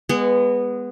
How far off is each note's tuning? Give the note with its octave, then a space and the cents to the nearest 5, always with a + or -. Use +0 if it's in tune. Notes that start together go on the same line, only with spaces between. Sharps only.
G#3 -25 B3 +0